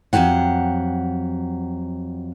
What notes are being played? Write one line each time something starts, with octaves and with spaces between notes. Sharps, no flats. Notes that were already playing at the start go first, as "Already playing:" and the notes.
F2 F3 F#3 G4 F#5